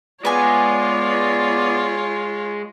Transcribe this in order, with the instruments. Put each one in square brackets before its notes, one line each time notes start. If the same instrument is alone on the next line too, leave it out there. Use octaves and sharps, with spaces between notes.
[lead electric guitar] G#3 G#4 [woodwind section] B3 D5 [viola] F4 C#5 [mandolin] B4 G#5